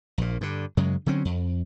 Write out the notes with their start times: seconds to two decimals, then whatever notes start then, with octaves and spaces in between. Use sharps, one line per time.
0.18 A#1 A#2
0.41 G2 D3
0.77 F#2 C#3 F#3 G#3
1.06 D3 F#3 C4 C#4
1.25 F2